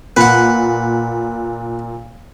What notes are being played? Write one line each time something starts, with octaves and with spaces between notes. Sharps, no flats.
A#2 B4 F#5